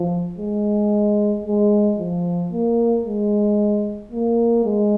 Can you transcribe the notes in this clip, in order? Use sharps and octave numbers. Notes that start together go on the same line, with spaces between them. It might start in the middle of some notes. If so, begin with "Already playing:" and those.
Already playing: F3
G#3
G#3
F3
A#3
G#3
A#3
G#3